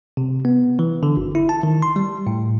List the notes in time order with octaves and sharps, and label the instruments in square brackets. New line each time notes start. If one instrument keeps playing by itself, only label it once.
[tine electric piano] C3
B3
E3
D3
G1
E4
A5
D#3
C6
G3
A2